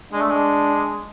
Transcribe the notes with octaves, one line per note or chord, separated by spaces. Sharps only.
G#3 D4
A3
G#3